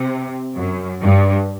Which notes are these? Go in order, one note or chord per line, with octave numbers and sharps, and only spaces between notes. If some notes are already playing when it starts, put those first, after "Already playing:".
Already playing: C3
F#2
G2